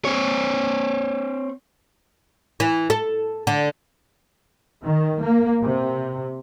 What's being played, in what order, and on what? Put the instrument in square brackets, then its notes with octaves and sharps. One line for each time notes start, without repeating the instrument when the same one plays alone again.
[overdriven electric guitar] C4 C#5
[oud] E3
A4
D3
[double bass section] D#3
A#3
C3